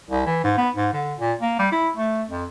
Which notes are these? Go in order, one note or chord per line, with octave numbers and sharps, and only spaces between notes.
C2
E3
G#2
B3
G#2
D3
A#2
A#3
G3
E4
A3
F2